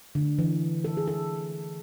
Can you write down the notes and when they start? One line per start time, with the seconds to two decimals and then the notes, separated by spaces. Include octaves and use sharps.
0.15 D3
0.39 E3
0.84 A4
0.97 G#4
1.08 A4